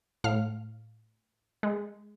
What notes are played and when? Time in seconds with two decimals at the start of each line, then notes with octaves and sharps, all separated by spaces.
0.24 A2 F5 F6
1.63 G#3